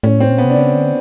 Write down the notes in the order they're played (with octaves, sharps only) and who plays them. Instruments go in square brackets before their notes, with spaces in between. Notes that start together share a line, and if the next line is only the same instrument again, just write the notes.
[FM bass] A2 [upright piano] C#4
[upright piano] C4
[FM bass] A#2
[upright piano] B3
[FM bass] C3
[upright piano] D4
[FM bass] C#3 [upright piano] C#4
[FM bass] D3